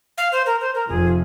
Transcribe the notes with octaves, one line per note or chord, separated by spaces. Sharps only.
F5
C5
A#4
C5
A#4
F1 F2 C3 F3 G#4